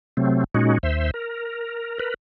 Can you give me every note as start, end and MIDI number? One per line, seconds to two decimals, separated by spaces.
0.17 0.44 48
0.17 0.44 54
0.17 0.44 57
0.17 0.44 60
0.55 0.78 46
0.55 0.78 56
0.55 0.78 61
0.55 0.78 63
0.55 0.78 66
0.83 1.11 39
0.83 1.11 72
0.83 1.11 76
1.14 1.99 70
1.99 2.14 70
1.99 2.14 71